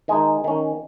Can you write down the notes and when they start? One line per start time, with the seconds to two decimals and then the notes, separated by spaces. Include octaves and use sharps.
0.08 D#3 G#3 D#4 D#5 G#5
0.44 D#3 C#4